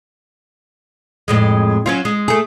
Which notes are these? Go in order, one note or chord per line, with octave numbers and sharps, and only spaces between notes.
F2 A2 G#3
F#3 C#4 F4
G#3
A3 G#4